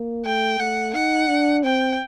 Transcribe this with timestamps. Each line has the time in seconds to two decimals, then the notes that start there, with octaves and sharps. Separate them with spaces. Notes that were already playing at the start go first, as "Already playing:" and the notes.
Already playing: A#3
0.25 A3 G5
0.59 A3 F#5
0.94 D#4 F#5
1.29 D4
1.63 C4 G5